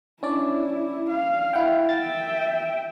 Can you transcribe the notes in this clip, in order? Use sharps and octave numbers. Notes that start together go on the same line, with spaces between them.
C#4 D4 E4 D5
F5
E4 F#5 G5
E5 G5 A6